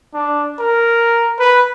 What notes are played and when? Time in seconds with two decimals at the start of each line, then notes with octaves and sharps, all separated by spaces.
0.14 D4
0.59 A#4
1.40 B4